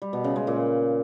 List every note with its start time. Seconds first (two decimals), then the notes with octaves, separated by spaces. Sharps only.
0.02 G3
0.13 B2
0.24 C#3
0.36 G#3
0.47 A#2